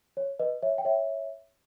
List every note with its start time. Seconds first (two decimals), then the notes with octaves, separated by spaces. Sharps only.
0.17 C#5
0.39 B4 D#5
0.62 C#5 E5
0.78 G5
0.85 C#5 E5